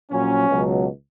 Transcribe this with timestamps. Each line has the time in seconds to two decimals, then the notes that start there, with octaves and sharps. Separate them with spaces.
0.11 A#1 A#2 F#3 C#4
0.48 C#2 B2 F#3